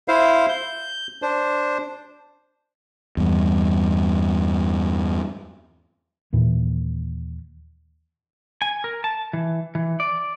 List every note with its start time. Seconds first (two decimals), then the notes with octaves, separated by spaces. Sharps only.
0.08 E4 C5 F5
0.49 G6
1.22 D4 C5
3.17 E2 G2
6.33 D#2 A#2 E3
8.62 G#5
8.84 A#4
9.04 A5
9.33 E3
9.75 E3
10.00 D5